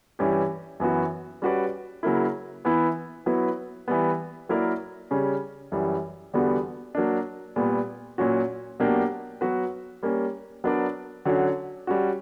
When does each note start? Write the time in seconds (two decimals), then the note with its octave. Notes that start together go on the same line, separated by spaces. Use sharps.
0.19 G2 E3 G3 C#4 G4
0.80 F#2 E3 B3 F#4
1.42 G3 C#4 F#4 B4 D5
2.03 C#3 F#3 A#3 E4
2.65 E3 B3 E4
3.26 F#3 B3 E4 B4
3.88 E3 G3 B3
4.49 F#3 A#3 E4 A#4 D5
5.11 C#3 G3 C#4
5.72 F#2 E3 G3
6.34 E2 D3 G3 B3 F#4
6.95 F#3 A#3 D4
7.56 A#2 G3 B3
8.18 A#2 F#3 C#4 F#4
8.80 B2 F#3 A#3 D4 G4
9.41 F#3 B3 F#4 B4
10.03 G3 A#3 C#4
10.64 F#3 B3 D4 A#4 D5
11.25 D3 F#3 C#4 F#4
11.87 G3 C#4 F#4